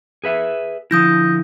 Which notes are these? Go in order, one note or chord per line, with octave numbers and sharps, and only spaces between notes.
G#4 B4 E5
D3 F3 E4 D#6 G6 A#6